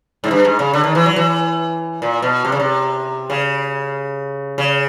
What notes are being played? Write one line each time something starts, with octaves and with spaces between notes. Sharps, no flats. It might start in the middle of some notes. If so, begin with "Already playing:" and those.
G#2
G2
G#2
C#3
D3
D#3
E3
F#3
E3
A#2
B2
C3
C#3
C3
C#3
C#3